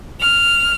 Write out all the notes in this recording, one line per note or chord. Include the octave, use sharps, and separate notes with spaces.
F6